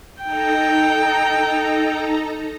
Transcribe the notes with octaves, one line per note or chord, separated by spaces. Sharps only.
D#4 A4 G5 A#5